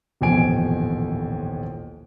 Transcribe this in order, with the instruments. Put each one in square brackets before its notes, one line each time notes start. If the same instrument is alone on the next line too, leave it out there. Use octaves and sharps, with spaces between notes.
[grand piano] D#1 A1 F2 B2 G#5 D7